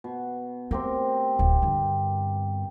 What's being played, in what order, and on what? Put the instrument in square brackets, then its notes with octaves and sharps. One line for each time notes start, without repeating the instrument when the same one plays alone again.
[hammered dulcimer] B2
[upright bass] A3 [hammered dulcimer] C4 G4 A#4
[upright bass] D1
G2 D3